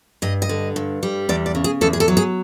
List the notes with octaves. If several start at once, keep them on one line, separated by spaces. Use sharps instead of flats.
G2 D#5
D#5
D3
G2
G3
E2 D5
D5
C#3
G#4
E2 A4
G#4
A4
F#3
G#4